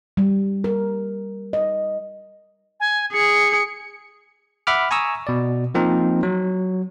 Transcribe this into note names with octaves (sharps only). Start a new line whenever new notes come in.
G3
A#4
D#5
G#5
G#4 C#7
E5 F#5 B5 D6 F6
G#5 A#5 C#6 D#6 E6
B2 D5
F3 A#3 C4 D#4 F4 A#4
F#3